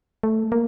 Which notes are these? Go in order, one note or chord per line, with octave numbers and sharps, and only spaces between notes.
A3
A#3